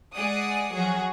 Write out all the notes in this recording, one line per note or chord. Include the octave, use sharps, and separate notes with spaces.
G#3 G#4 D5 F#5 D#6
F#3 F#4 G#4